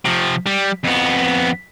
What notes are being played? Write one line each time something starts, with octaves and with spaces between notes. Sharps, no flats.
C3 F3
G3
F2 B3